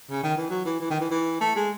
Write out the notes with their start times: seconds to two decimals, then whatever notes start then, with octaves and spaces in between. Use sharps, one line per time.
0.11 C#3
0.23 D#3
0.37 E3
0.50 F#3
0.65 E3
0.81 E3
0.90 D#3
1.01 E3
1.11 E3
1.41 A3
1.56 G#3